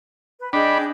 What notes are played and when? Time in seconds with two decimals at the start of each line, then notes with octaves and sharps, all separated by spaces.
0.40 B4
0.53 D4 G#4 D#5 G5 B5